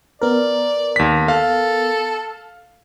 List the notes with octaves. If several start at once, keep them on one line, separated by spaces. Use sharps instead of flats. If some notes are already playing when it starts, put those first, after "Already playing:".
B3 A#4 D5
D#2 B6
A4 F5